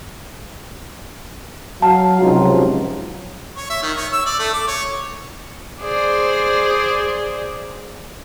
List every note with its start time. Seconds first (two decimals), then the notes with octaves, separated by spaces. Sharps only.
1.82 F#3 F5 A5
2.21 C#2 C3 F3 F#3 D#4 F4
3.57 C#5
3.70 E5
3.83 D#3
3.97 C#5
4.13 E6
4.26 D5
4.39 A3
4.53 D6
4.68 C#5
5.81 G#4 C5 D5